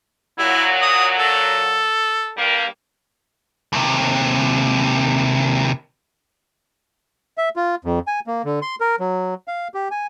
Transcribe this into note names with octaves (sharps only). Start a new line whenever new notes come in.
A#2 F#3 E4
D#6
A4
G2 G3 A#3
D#2 C3
E5
F4
F2
G#5
A#3
D3
C6
A#4
F#3
F5
G4
G#5